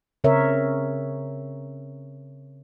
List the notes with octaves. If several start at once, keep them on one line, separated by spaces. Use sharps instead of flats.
C#3 C4 A#4 C#5 E5